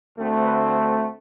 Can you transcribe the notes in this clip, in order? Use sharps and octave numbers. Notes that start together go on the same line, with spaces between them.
D2 D3 A3 C4
B4